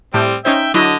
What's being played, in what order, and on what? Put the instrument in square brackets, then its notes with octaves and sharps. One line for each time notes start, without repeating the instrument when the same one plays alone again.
[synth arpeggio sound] A2 [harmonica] G3 C4
[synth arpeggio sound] C#4 D#4 C5 [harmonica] E5 G5
[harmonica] D3 D#5 [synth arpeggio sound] F#3 E4